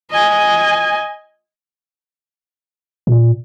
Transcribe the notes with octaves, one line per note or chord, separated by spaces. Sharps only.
D#5 G#5
A#2